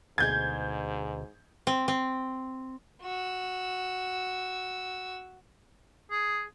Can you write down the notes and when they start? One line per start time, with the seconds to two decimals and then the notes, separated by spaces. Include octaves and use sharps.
0.18 D2 G#2 B2 G#4 G6 G#6
1.67 C4
1.88 C4
3.02 F#4 E6
6.11 G#4